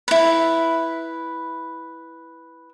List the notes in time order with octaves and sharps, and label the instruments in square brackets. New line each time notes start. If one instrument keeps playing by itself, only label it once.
[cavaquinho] E4 B4